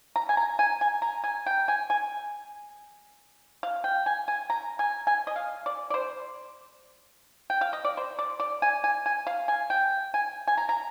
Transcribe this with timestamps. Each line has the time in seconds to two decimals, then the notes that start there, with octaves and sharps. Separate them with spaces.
0.16 A#5
0.29 G#5
0.37 A#5
0.59 G#5
0.81 G#5
1.02 A#5
1.24 G#5
1.46 G5
1.68 G#5
1.90 G#5
3.63 F5
3.84 G5
4.06 G#5
4.28 G#5
4.50 A#5
4.79 G#5
5.07 G#5
5.27 D#5
5.36 F5
5.66 D5
5.90 D5
5.94 C5
7.50 G5
7.61 F5
7.73 D#5
7.85 D5
7.97 C5
8.19 D5
8.40 D5
8.62 G#5
8.84 G#5
9.06 G#5
9.27 F5
9.48 G#5
9.70 G5
10.14 G#5
10.48 G#5
10.57 A#5
10.69 A#5